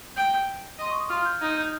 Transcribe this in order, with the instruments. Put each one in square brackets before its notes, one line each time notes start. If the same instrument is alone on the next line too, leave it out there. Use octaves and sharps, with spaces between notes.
[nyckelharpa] G5 [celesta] G6
[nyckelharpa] D#5 [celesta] C6
[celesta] C#6
D#6
[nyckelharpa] F4 [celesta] F6
[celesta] F6
G6
[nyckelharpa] D#4 [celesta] G#6
[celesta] G6